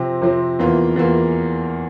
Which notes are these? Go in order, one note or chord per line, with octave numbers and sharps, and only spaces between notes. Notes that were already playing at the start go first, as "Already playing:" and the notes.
Already playing: C3 F3 C4
C3 F3 C4
E2 E3 A#3 F4
E2 E3 A#3 F4